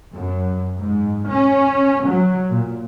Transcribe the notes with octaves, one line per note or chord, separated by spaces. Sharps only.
F#2
G#2
C#4
F#3
A#2